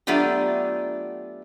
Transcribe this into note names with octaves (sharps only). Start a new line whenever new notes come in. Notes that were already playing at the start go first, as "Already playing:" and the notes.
F#3 A3 B3 D4 F4 G4